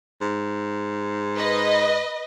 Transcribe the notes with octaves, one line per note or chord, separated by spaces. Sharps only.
G#2
B4 D#5